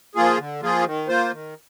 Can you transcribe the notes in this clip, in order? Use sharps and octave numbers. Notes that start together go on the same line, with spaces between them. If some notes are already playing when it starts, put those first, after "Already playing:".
F3 A#3 F4 G#4
D3
F3 A#3 F4 G#4
D#3
A#3 F4 C5
D#3